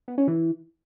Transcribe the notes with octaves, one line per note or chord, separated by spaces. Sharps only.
B3
C#4
E3